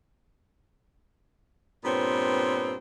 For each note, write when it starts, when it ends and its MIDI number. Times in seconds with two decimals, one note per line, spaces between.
1.84 2.75 43
1.84 2.75 46
1.84 2.75 59
1.84 2.75 60
1.84 2.75 73